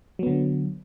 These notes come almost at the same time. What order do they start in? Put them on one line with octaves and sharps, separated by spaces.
F#3 B3 D3